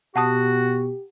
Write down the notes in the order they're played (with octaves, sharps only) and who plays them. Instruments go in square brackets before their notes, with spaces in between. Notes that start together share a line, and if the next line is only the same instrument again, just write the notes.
[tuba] B2 [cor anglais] F#4 [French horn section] G4 [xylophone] F#5 A5 D#6